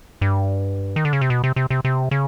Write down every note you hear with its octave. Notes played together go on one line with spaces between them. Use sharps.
G2
D#3
D3
C#3
C3
B2
C3
C3
C3
C3
C#3